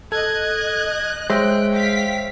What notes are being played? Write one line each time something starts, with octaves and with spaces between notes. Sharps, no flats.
A4 D#5 F#6 G#6
G#3 C5 C#5 E5 G5
F5 B6